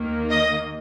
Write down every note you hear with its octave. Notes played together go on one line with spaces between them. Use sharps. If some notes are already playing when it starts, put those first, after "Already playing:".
Already playing: D#2 D#3 A#3
D#5